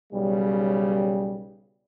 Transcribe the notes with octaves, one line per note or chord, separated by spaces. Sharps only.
B1 C#3 G3